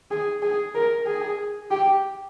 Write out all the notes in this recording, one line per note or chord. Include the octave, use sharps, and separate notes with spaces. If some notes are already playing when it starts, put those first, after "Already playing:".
G#4
G#4
A#4
G#4
G4